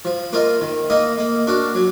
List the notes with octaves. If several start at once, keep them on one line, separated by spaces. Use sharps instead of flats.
F3
A#3 F4 A#4 D#5
D#3
A#3 D#4 A#4 D#5
A#3
D4 F#4 A#4
F#3